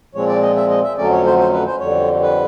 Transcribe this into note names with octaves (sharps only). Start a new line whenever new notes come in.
A#2 F3 G#3 C4 C#5
D5
D#5
E5
D#5
E5
F2 D3 F#3 A3 C#4 D5
C#5
C5
C5
B4
C5
F2 D3 G3 C#5
B4